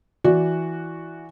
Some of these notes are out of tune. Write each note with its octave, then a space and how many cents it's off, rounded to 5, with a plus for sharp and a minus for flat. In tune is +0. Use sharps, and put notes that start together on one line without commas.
E3 +0 F#4 -5 D5 +0